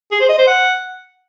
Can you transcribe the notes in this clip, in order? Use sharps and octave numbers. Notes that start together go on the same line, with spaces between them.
G#4
C5
D#5
C5
F#5